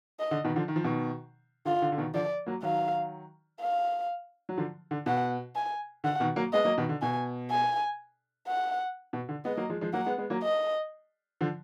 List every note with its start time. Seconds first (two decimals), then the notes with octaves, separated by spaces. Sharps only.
0.20 D#5
0.31 D3
0.45 B2 D#3
0.56 D3 F3
0.68 D#3
0.76 F3
0.84 B2 D#3
1.65 D3 F4
1.82 D3
1.92 D3
1.98 B2 D#3
2.14 D3 F3 D5
2.46 F#3 A#3
2.63 D#3 F#3 F5
3.61 F5
4.49 F#3
4.58 D3 F3
4.91 D3
5.06 B2 F#5
5.56 G#5
6.04 D3 F#5
6.20 B2 D#3
6.36 F#3 A#3
6.53 G#3 B3 D#5
6.65 F#3 A#3
6.78 B2 D#3
6.89 D3
7.02 B2 G#5
7.51 G#5
8.48 F#5
9.13 B2
9.29 D3
9.45 G#3 B3 D#5
9.57 F#3 A#3
9.70 F3 G#3
9.81 F3 G#3
9.93 F#3 A#3 F#5
10.06 G#3 B3
10.18 G#3 B3
10.30 F#3 A#3
10.43 D#5
11.41 D3 F3